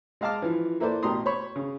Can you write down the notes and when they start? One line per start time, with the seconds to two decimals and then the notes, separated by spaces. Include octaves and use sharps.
0.21 G#3 D#5 F5 A5 D6 F6
0.42 E3 F3
0.80 A#3 E4 A4 B4 C5 D5
1.03 A1 B2 G4 A#5 C6 D#6
1.25 C5 C#5 B5 C#6
1.56 C#3